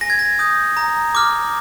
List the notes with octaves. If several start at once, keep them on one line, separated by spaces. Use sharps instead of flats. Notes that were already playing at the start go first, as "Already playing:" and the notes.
G#5 A#6
G#6
A#6
D#6 G6
A#5
D6 F6